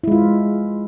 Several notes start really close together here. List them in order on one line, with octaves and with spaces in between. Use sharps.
E4 G#3 F4